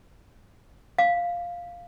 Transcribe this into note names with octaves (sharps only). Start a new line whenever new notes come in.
F5